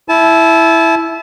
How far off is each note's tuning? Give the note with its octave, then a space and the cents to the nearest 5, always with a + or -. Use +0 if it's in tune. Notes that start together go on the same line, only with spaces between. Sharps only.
E4 +0 A5 -30